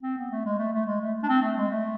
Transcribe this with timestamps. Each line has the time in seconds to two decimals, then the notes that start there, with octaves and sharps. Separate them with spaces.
0.03 C4
0.17 B3
0.31 A3
0.45 G#3
0.58 A3
0.73 A3
0.86 G#3
1.01 A3
1.23 D4
1.29 C4
1.42 A3
1.57 G#3
1.70 A3